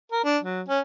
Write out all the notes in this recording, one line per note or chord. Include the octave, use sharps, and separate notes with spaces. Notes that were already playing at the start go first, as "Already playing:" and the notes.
A#4
D4
F#3
C#4